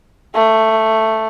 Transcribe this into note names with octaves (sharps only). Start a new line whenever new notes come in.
A3